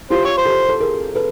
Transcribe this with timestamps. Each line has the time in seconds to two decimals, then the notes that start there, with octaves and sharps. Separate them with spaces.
0.10 F4 G4 C5
0.25 C#5
0.38 C5
0.45 G4 A4
0.69 A4
0.80 G#4 A#4
1.15 A4 B4